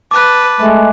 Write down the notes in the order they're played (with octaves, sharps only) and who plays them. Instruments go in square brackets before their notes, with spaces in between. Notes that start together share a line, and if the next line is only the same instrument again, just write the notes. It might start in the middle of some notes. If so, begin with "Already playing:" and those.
[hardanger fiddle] B4 A5 [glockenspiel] D6 F#6
[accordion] G#3 A3